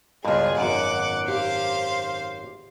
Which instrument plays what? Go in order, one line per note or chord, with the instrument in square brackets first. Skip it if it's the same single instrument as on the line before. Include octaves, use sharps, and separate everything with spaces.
[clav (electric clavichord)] C#2 G2 [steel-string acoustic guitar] B2 F4 [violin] G#4
[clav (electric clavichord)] G#1 F#2 [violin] F#5 D6
[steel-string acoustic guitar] G4 [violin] C5 F5